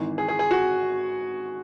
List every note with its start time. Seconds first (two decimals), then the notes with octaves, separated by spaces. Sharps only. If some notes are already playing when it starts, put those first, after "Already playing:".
Already playing: G#1 G#2 E3
0.18 G#4
0.28 G#4
0.39 G#4
0.51 F#4